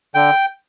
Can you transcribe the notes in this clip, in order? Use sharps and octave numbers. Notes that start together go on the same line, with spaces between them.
D3 G5